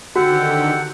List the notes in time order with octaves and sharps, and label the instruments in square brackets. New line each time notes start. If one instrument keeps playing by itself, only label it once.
[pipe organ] D3 D#3 G4 [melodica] C4 A4 C5 [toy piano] F#4 [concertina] F#5